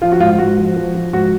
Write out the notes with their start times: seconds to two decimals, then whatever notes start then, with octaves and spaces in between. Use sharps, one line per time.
0.02 F3 F4
0.12 F#4
0.20 G#2 F4
0.32 F4
0.38 G#2 F#4
0.58 F3
0.76 F3
0.95 F3
1.13 G#2 F#4